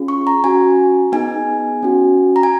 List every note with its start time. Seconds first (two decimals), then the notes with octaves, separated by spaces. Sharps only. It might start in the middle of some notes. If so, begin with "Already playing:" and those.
Already playing: C#4 F4 G#4
0.08 C#6
0.27 A#5
0.43 C#4 F#4 G#5
1.12 B3 D#4 G#4 G#5
1.83 C#4 F#4
2.36 A#5
2.43 G#5